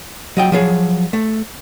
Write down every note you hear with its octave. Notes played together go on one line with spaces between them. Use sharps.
F#3 D#5 G5
F3 F#3 G#4
A3